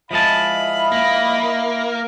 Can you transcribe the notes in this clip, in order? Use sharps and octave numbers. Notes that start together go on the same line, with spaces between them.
F3 G#3 E4 D#5 F5 A5 B5
A#3